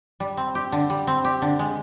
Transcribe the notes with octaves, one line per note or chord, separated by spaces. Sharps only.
G3
C4
G4
D3
G3
C4
G4
D3
G#3